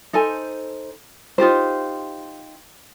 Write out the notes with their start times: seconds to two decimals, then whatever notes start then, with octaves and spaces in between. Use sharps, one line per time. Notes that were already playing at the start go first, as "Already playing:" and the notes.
0.13 D#4 A4 C5 G#5
1.38 D#4 F4 G4 C5